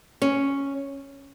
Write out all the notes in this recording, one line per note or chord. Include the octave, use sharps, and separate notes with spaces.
C#4